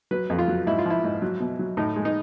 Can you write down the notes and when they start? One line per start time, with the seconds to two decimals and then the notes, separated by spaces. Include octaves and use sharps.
0.11 F#3 B4
0.30 F2
0.39 F4
0.48 F#3
0.67 G#2 E4
0.78 F4
0.86 F3 E4
1.04 G#2
1.22 F#3
1.40 B2
1.59 F#3
1.77 A2 D#4
1.96 G#3
2.05 D#4